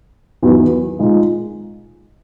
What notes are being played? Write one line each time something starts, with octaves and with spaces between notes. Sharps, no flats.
E2 D#3 F#3 B3
A#2 G#3 D#4